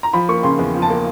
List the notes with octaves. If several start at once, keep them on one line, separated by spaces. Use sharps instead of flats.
A#5
F3 B5
A#3 C#6
C#3 C6
E2
F3
A5
A#3